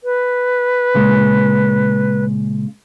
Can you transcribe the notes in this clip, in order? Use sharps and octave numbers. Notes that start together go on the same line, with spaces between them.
B4
A#2 C#3 G#3